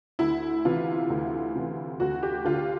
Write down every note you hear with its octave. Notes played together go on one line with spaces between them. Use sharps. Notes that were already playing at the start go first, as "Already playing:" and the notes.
D2 E4
C3 E3 F4
D2
C3 E3
D2 F#4
G4
D3 F4